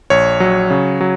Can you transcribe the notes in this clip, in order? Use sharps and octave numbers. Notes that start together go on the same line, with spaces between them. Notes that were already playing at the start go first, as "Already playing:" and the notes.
A#1 C#5
F#3
C#3
F#3